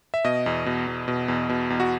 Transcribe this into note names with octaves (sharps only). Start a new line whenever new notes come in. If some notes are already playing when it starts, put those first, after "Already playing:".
E5
B2 D#5
E2
B2
E2
B2
E2
B2
E2
F#4